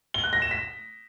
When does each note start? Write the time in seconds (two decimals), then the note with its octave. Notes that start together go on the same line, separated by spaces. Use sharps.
0.14 G7
0.24 F#6
0.33 A#6
0.42 E7
0.51 B6